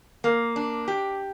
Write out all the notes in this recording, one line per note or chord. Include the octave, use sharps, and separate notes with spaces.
A#3
D4
G4